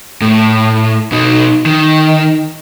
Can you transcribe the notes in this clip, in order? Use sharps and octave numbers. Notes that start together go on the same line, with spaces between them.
A2
B2 D#4
D#3